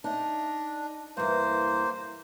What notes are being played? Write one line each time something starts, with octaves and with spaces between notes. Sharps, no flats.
D4 D#4
E2 G2 A#3 C5